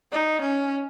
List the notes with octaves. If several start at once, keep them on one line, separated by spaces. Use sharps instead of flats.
D#4
C#4